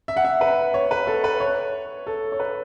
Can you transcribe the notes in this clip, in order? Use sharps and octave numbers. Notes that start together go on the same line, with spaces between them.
E5
F#5
E5
B4
C#5
B4
A4
B4
C#5
A4
C#5
B4